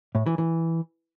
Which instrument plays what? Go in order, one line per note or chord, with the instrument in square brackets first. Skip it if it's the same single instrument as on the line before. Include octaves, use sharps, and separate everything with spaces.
[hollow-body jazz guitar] A2
E3
E3